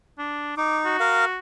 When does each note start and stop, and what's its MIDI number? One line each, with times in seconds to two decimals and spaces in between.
0.18 0.53 62
0.57 0.97 63
0.57 0.78 86
0.85 1.39 66
1.00 1.25 70
1.00 1.25 77